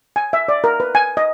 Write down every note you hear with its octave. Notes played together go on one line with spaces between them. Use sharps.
G#5
E5
D5
A#4
B4
G#5
D#5